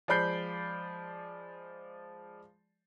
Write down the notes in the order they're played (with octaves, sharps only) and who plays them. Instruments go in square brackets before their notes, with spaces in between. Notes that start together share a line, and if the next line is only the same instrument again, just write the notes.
[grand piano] F3 G#3 D5 B5 G6 C7